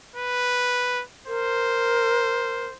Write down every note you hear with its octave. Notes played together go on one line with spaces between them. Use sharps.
B4
A#4 C5